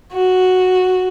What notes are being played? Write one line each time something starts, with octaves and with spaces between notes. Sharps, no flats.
F#4